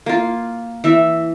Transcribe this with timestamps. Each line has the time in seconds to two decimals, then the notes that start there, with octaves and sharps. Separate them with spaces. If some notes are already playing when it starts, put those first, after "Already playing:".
0.06 A#3 F4
0.84 E3 E5